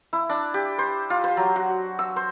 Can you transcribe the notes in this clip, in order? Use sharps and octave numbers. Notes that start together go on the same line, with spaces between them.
E4
D4
G4
C5
F4
C5
F#3
F#4
E6
C5